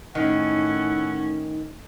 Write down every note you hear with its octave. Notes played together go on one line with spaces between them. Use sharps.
A2 D#3 C#4 D#4 E4 F#5